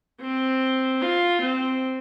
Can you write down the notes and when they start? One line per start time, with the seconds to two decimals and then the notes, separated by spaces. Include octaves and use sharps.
0.21 C4
1.01 F4
1.42 C4